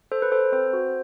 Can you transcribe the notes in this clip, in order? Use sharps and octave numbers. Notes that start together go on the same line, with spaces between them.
A4 C5
B4
A4 C5
C4 C5
F#4